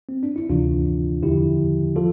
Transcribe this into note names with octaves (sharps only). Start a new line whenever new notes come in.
C4
D4
E4
D2 C3 E3 D4 F4
E2 D3 F3 E4 G4
F3 F4 A4